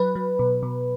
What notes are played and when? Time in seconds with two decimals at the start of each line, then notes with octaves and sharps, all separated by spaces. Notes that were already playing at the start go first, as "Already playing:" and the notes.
Already playing: F#3 B4
0.16 F#3
0.39 B2
0.63 B2